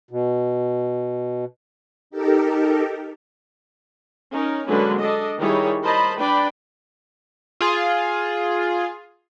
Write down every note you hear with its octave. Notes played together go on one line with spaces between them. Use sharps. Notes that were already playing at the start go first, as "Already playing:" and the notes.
B2
D#4 G4 A4 A#4
C#4 D#4 A#4
D3 F#3 G#3 A#3 C#4 B4
D4 A4 D#5
D#3 G3 D#4 E4 G#4 C#5
A#4 C5 D#5 A5 B5
D4 B4 D5 G5 B5
F4 G#4